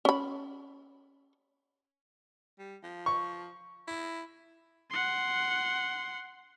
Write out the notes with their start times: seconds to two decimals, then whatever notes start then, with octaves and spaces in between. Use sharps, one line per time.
0.05 C#4 B5
2.59 G3
2.83 F3
3.06 C#6
3.88 E4
4.90 F#5 C6